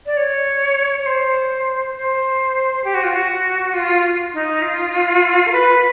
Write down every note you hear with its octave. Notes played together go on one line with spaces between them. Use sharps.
D5
C#5
C#5
C5
C5
G4
F#4
F4
F#4
F4
D#4
F4
A#4
B4